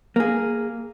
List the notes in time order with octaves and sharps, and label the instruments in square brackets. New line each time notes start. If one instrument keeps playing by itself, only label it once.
[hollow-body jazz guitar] A#3 G#4